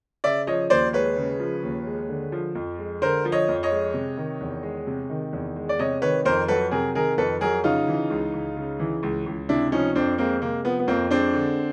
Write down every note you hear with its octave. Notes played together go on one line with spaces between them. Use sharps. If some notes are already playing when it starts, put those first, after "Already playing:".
C#3 D5 E5
F3 C#5 D#5
D#2 C5 D5
G#3 B4 C#5
C#3
F3
D#2
G#3
D3
F3
F2
G#3
D3 A#4 C5
F3
C#5 D#5
F2
C#5 D#5
G#3
C3
D#3
E2
G#3
C3
D#3
E2
G#3
D5
C3 C#5 D#5
D#3 B4 C#5
F2 A#4 C5
F#3 A4 B4
C3 G#4 A#4
D#3 G#4 A#4
F2 A4 B4
F#3 G#4 A#4
C#3 D#4 F4
E3
C#2
C#2
C#3
E3
C#2
C#2
C3 D4 E4
F3 C#4 D#4
F2 C4 D4
G#3 A#3 C4
C3 A#3
F3 B3
B3
F2 A#3 C4
G#3 C4 D4
D3